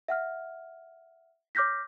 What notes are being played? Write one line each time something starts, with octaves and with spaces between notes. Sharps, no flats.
E5 F#5 F6
C#5 D6 F6 G6 A#6 B6